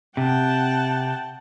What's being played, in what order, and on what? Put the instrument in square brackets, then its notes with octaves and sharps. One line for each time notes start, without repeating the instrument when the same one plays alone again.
[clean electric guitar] C3 [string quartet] F#5 G5 A5